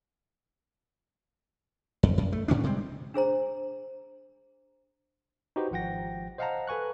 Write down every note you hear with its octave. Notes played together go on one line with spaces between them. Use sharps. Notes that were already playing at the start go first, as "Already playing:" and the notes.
F2
F#2
A3
A2 D3 C#4 D4
C3 G3 G#3 C4
D4 G#4 C5 A#5
D#4 F#4 G4 B4 C5
G#1 F3 F#5 G5 A#6
C5 D#5 F5 F#5 A5 A#5
A4 B4 G#5 C#6 F#6